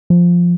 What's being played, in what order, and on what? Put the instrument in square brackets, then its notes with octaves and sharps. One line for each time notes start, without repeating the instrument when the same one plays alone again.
[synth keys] F3